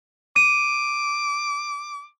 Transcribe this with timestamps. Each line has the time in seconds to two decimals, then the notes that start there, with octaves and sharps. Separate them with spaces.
0.36 D6 D#7